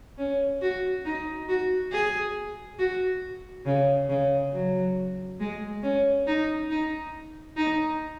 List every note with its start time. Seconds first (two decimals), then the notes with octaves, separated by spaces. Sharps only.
0.18 C#4
0.62 F#4
1.05 D#4
1.49 F#4
1.92 G#4
2.79 F#4
3.66 C#3
4.09 C#3
4.53 F#3
5.40 G#3
5.83 C#4
6.27 D#4
6.70 D#4
7.57 D#4